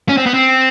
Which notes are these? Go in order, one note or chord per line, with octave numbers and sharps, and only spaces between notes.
C#4
C4
B3
C4